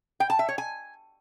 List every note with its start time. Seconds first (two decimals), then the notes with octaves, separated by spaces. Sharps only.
0.20 G5
0.30 A5
0.39 E5
0.49 C#5
0.58 G#5